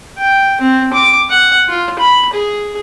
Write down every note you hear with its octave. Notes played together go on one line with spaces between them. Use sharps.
G5
C4
D6
F#5
F4
B5
G#4